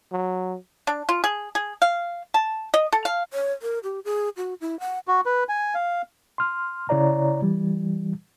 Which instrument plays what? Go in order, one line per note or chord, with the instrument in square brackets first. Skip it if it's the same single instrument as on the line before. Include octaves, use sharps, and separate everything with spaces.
[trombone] F#3
[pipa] D4
F4
G#4
G#4
F5
A5
D#5
A4
F5
[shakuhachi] C#5
A#4
G4
G#4
F#4
E4
F#5
[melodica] F#4
B4
G#5
F5
[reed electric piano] C6 F6
C#3 E4 C#5 D5 A#5
E3 G3